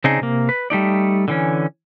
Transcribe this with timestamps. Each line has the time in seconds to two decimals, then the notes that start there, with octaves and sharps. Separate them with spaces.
0.04 C#3 C4 D4 D#4 G#4
0.21 C3 A#3
0.49 B4
0.70 G3 A3 D#4 D5
1.28 D3 E3 C#4